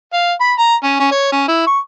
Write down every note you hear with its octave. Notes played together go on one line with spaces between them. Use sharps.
F5
B5
A#5
C#4
C#4
C#5
C#4
E4
C#6